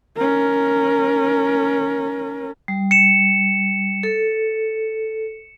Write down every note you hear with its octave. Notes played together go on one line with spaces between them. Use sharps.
C#4 A#4
G3
C#7 E7
A4